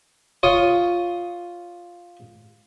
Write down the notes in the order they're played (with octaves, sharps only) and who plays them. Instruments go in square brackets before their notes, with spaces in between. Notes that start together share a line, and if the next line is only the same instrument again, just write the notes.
[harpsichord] F4 C#5 D#6